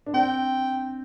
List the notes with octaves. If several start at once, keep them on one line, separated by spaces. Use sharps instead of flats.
D4
C4 G5